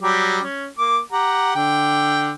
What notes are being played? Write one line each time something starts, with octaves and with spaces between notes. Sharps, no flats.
F#3 G3 G4
C#4
A#3 D6
G4 F#5 A#5
D3 G5